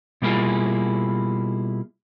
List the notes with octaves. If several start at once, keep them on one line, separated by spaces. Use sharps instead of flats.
B2 G3 A#3 E4 F4 G#4